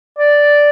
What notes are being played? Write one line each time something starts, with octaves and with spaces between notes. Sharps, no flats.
D5